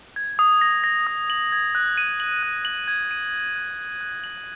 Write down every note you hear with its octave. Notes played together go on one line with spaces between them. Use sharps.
G#6
D#6
A#6
A#6
D#6
F#7
G#6
F#6
D#7
F#7
F#6
F#7
G#6
D#7
A#6
F#6
F#6
F#6
F#7